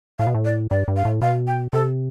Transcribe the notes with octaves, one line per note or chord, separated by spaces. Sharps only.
A2 F5
B2
A2
D5
G2 D5
G2
F5
A2
B2 F5
G5
C3 A4